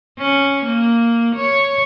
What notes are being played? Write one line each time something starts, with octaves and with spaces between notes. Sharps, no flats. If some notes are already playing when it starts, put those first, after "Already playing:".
C#4
A#3
C#5